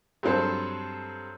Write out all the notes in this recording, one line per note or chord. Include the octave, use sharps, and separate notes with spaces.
G2 F#3 C4 A4